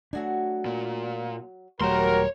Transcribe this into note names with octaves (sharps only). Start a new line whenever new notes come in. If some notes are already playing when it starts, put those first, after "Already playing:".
F#3 A3 D4 F#4 G#5
A#2
D#1 F#3 A3 F#4 G4 A#4 C#5 C6